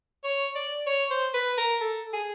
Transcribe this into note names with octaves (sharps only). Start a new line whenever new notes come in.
C#5
D5
C#5
C5
B4
A#4
A4
G#4